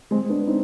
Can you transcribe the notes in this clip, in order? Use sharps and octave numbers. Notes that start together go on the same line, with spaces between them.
G#3 C4
B3 D4
C4 D#4